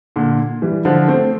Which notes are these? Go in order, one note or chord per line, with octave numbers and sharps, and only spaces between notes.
A#2 D3
E3 G3
D3 F3
A3 C4